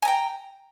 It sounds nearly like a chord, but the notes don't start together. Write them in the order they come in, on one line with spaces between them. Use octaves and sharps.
G#5 A#5 G5